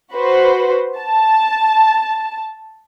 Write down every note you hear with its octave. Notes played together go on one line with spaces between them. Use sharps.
F#4 B4 C5
A5